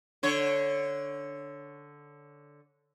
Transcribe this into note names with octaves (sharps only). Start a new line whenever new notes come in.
D3 C#5